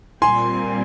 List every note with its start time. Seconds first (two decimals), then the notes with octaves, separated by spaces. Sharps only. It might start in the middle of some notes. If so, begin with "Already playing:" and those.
0.22 A#2 G3 C4 G#5 C6